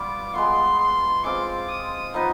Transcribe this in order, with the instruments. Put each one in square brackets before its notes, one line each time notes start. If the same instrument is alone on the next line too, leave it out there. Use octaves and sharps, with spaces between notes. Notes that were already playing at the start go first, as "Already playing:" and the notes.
Already playing: [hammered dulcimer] G3 B3 F4 [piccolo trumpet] D6
[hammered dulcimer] G#3 B3 F4 [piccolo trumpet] C6
[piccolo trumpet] C6
[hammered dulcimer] G#3 C4 F4 [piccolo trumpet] D6
[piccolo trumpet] D#6
[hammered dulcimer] F3 B3 D#4 B4